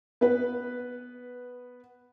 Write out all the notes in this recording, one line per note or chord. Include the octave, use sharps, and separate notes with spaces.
B3 B4